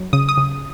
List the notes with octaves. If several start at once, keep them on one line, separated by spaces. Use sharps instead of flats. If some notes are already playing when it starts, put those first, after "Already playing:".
Already playing: F#3
C#3 D#6
D#6
C#3